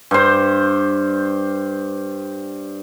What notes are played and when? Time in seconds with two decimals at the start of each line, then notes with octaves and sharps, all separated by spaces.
0.11 G2 C5